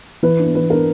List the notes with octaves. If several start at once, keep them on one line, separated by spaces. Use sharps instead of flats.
E3 B4
B3 D4
E3 B4
B3 D4 A#4